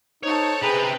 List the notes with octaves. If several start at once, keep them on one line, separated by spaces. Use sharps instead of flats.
D#4 A4 C5 C#5
C3 G#4 B4 G5 A#5